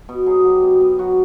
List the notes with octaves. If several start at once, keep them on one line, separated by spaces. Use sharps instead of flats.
B2
F#3 G#4
F#3 G4
B2
B2
F#3 F#4